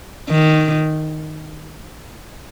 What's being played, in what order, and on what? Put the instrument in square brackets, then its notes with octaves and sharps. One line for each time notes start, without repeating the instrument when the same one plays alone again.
[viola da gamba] D#3